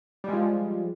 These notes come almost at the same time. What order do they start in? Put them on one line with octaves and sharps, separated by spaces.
G3 G#3 F3